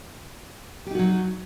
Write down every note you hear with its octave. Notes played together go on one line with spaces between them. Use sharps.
F#3 D#4 F#4 G4